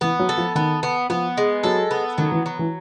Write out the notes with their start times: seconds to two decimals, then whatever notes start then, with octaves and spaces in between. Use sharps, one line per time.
0.01 E3 B3
0.19 F#3
0.29 A4
0.37 F3
0.55 D#3 B3
0.83 B3
1.10 F3 B3
1.37 G#3
1.63 F#3 A4
1.91 B3
2.18 D#3 F#3
2.32 E3
2.46 F#3
2.59 E3